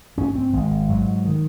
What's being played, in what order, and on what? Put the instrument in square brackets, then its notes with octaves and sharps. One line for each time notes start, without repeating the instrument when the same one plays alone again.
[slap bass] G#2 C#4
C4
G#1 G#3
G#2 F#3
D#3